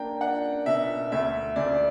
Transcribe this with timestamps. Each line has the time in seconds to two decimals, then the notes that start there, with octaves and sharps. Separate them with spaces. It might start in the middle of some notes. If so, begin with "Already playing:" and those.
Already playing: A#3 D4 G5 A#5
0.21 D4 F#5
0.66 B2 E5
1.12 D2 E5
1.56 D2 D5